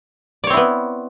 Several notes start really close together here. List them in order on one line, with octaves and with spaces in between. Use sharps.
D5 C#5 C4 E4 B3